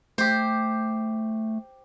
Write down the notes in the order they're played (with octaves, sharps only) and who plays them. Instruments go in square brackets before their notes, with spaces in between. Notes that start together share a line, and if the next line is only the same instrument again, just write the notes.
[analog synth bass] A3 [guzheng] G4 C5